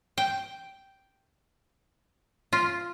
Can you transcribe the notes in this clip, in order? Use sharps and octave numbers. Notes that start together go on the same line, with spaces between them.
G5
F4